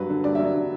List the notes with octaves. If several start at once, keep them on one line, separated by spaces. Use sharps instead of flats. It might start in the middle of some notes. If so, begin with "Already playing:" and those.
Already playing: G2 F#3 B4
D3
G2 D5
F#3 E5
D5
D3